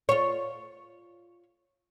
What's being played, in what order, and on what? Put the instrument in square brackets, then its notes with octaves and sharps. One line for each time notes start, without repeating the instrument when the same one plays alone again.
[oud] F4 C#5